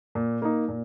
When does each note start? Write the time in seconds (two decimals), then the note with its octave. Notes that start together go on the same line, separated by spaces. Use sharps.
0.15 A#2
0.42 A#3 D#4
0.68 A#2